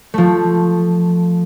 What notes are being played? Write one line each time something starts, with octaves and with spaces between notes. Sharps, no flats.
F3 A3